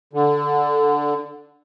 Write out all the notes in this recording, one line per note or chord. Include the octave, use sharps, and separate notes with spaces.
D3